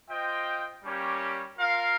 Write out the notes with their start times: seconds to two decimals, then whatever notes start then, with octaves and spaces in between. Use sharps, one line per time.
0.09 F4 C5 D#5 G5
0.83 G3 A#3 C#4 G4 C#5
1.58 F4 A#4 F5